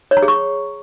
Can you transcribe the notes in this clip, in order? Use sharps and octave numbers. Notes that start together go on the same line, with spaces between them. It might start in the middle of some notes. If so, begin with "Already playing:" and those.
C#5
A#5
G#4
C#6